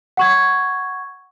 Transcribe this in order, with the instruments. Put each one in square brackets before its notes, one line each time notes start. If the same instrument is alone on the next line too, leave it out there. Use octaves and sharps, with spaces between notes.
[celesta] F#5 C#6 G#6